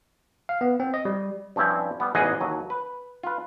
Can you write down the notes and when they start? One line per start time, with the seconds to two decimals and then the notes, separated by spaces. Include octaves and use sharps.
0.49 F5
0.61 B3
0.80 C4
0.94 D#5
1.05 G3
1.56 G2 F3 C4 C#4 E4
2.00 G3 B3
2.15 A1 E2 G#2 G#4 D#5 F#5
2.41 D#2 F#3
2.70 B4
3.23 F4 B4